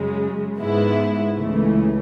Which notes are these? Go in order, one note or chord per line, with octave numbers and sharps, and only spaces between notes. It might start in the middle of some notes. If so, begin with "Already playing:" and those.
Already playing: F#2 C#3 G#3
G#2 G#3 B3 E4
C#2 C#3 E3 A3